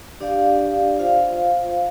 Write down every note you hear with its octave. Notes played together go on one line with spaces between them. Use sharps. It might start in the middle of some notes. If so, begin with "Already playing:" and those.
D4 G4 D5 F5
F4 C5 F5